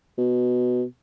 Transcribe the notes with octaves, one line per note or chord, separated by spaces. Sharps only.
B2